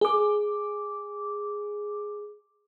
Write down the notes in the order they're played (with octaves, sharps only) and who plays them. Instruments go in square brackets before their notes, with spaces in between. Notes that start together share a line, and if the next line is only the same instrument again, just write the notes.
[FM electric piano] G#4 D6